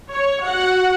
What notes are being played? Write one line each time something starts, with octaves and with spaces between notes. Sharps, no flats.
C#5
F#4 F#5